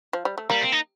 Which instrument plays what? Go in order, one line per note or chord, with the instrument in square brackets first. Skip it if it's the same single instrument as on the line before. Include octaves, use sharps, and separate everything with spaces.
[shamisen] F3
G3
A3
[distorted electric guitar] G3 [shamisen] A#3
[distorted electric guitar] C4
D#4